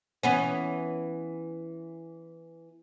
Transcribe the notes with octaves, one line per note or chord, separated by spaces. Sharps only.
E3 B3 C#4